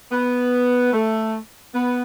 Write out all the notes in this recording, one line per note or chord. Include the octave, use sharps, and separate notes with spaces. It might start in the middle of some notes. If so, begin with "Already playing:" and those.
B3
A3
B3